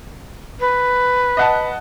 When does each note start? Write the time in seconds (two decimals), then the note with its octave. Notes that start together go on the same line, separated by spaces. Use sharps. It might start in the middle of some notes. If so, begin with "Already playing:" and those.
0.60 B4
1.37 D#5 F#5 A5